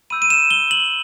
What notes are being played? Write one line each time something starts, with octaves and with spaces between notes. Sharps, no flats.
B5 E6 G6 D#7
D#7
E7
G7
F#7